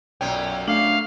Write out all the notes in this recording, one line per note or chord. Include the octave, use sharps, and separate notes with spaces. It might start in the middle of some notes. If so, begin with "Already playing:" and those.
B1 F#2 A#2 C#4 G5
A3 D4 F5